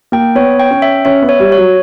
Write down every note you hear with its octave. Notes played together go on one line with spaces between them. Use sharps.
A#3 G5
B3 C#5
G5
C#4
E5
C#4 E5
B3
C#5
G3
C#5
F#3